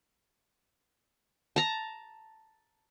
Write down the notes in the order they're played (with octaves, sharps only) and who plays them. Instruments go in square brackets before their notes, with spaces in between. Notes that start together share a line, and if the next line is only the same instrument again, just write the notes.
[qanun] A5 A#5